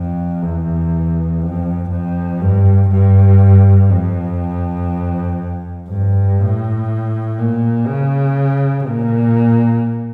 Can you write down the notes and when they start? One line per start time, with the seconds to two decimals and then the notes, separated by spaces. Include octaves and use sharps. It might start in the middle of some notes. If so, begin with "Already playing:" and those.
Already playing: F2
0.42 E2
1.42 F2
1.91 F2
2.41 G2
2.91 G2
3.90 F2
5.89 G2
6.39 A2
7.39 A#2
7.87 C#3
8.88 A#2